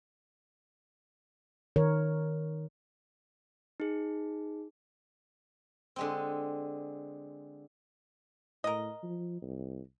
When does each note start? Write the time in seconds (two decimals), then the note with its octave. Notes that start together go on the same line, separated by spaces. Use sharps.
1.76 D#3 A#4 C#5
3.80 D#4 G#4
5.96 D3 G#3 C4
8.64 A2 A#4 D#5
9.03 F3
9.42 C2